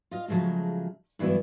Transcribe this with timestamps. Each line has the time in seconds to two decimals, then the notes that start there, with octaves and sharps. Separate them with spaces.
0.11 F4 D#5 F5
0.28 C#3 F3 F#3 G#3 A3
1.19 G2 E3 F#3 B3 E4